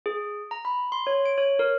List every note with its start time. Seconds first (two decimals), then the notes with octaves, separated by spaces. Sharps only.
0.06 G#4
0.51 A#5
0.65 B5
0.92 C6
1.07 C#5
1.25 D7
1.38 C#5
1.59 A#4